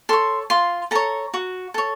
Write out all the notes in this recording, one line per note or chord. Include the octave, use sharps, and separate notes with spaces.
A4 C#5 C6
F4 C6
A4 C#5 A#5
F#4
A4 C#5